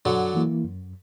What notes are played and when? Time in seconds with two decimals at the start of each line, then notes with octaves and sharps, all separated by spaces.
0.05 F#2 D3 F#3
0.34 E3 A#3 E4
0.63 F#2